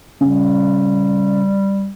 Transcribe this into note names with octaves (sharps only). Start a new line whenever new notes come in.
C#3 G3